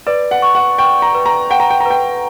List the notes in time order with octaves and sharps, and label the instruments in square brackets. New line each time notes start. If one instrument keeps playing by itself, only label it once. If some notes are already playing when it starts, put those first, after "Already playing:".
[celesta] B4 [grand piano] D5
[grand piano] F#5
[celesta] C#6
[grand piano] F#5
[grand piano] G5 [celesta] C#6
[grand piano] A#5
[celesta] B4
[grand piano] A#5
[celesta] F#5 [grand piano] G5
[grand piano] A#5
G5
A#5
[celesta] B4 [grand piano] G5